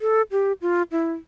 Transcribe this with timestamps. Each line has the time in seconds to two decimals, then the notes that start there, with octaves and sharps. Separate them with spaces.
0.01 A4
0.32 G4
0.62 F4
0.92 E4